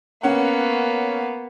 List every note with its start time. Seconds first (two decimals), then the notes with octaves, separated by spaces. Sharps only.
0.23 A#3 B3 C#4 F#5